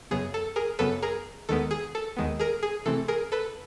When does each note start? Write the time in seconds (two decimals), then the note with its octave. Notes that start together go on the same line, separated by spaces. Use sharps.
0.11 F#2 C#3 F#3 B3 G#4
0.34 A4
0.56 G#4 A#4
0.79 F#2 C#3 F#3 B3 A4 B4
1.02 G#4 A#4
1.49 D#2 D#3 G#3 B3 A4
1.71 G#4
1.95 A4
2.17 D#2 D#3 G#3 B3
2.39 G#4 A#4
2.63 G#4
2.86 C3 E3 A3 C4 A4
3.08 G#4 A#4
3.32 A4 B4